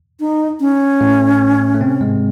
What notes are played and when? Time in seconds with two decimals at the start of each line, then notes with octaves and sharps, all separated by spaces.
0.20 D#4
0.60 C#4
1.01 A2 A3
1.74 A3
1.81 C3 C4
2.01 G#2 G#3